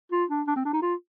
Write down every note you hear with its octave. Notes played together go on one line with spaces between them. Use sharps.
F4
D4
D4
C4
D4
D#4
F4